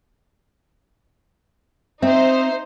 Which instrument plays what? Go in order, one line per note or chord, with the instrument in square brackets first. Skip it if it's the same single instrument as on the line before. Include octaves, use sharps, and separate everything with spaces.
[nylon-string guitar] C4 [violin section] D#4 C5 [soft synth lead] E5